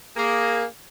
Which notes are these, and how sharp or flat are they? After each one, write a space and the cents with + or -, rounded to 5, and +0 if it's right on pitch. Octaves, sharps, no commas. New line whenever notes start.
A#3 +0 G#4 -15